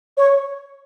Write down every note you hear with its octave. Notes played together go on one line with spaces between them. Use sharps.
C#5